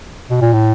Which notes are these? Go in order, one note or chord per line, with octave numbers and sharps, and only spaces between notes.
B2
A#2
A2